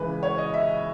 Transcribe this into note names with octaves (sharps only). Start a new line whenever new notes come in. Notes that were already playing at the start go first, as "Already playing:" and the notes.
Already playing: C#2 C#3 E3 B4
C#5
D#5
E5